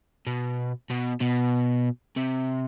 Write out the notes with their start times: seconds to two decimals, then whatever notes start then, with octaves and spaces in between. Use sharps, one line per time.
0.27 B2
0.90 B2
1.21 B2
2.17 C3